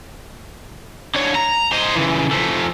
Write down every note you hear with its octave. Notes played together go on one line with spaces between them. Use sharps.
D3 C#5
A#5
C5 D#5
C#3 E3
F3 A3